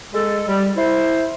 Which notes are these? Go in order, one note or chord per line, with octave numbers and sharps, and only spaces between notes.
G#3 A4
G3
E4 C5